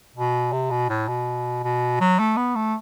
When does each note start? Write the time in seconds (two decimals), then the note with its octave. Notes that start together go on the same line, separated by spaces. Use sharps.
0.16 B2
0.52 C3
0.70 B2
0.89 A2
1.08 B2
1.64 B2
2.00 F#3
2.19 A3
2.37 B3
2.56 A3